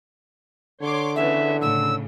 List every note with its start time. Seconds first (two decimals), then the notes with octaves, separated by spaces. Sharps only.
0.82 D3 C#5 C6 D6
1.15 C#3 E3 B3 E5
1.61 A2 C#3 E6